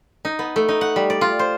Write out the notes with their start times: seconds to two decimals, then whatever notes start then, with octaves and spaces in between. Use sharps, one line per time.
0.25 D#4
0.39 B3
0.56 A3
0.69 D#4
0.81 F#5
0.96 G3
1.10 D5
1.21 F4
1.39 C5